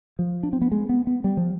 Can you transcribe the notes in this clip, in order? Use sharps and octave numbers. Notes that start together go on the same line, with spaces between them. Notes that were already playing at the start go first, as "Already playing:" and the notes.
F3
D4
C4
B3
G#3
B3
B3
G3
F3